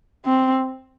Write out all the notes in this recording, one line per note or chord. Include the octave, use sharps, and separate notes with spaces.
C4